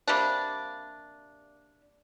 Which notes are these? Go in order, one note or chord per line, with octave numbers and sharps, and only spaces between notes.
C3 G3 A#3 D4